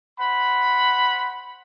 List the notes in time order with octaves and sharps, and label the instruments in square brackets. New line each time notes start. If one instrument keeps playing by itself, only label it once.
[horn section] C5 F#5 B5